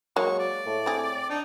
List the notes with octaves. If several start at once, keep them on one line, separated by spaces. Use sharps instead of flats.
F#3 G#3 A#3 C#6
D5
A2
C4 G#4
D4 D#4